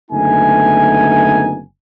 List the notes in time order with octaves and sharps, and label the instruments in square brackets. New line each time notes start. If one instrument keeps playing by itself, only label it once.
[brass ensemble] F#1 D3 A3 B3 D#4 G#5